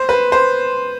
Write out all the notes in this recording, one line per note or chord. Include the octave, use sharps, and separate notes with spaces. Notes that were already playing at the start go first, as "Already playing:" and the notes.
Already playing: C5
B4
C5